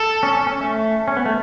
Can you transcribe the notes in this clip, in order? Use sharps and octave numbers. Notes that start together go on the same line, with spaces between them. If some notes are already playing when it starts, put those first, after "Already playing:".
Already playing: A4
C#4
C#4
C#4
A3
C#4
B3
A3